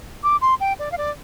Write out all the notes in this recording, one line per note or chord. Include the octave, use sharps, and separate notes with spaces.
D6
C6
G5
D5
F5
D5